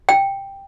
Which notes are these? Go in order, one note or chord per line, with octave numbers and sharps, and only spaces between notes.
G5